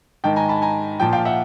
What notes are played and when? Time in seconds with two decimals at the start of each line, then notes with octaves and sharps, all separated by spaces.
0.24 G#2 D#3 G5 A5
0.36 G#5 A#5
0.49 A5 B5
0.62 G#5 A#5
1.00 A#2 F3 G5 A5
1.13 F5 G5
1.25 E5 F#5